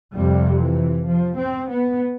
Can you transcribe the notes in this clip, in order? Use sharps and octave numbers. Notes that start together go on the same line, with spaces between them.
F2 C3 G3
E3
F3
C4
B3